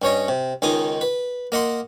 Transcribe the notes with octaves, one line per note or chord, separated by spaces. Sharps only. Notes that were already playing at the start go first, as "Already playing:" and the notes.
G2 C#4 C#5 D#5
C3
C#2 D#3 D#4 G#5 D#6
B4
A#3 D#5 F#5 C6